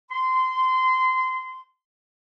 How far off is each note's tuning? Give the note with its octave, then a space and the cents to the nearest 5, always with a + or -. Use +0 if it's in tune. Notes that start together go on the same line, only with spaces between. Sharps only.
C6 -20